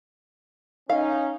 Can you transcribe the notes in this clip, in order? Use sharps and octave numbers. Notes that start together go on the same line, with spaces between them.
C#4 D#4 F5